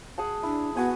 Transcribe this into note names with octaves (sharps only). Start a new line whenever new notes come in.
G#4 F#5 A5
D4 E4
B3 F#4 G#5 C#6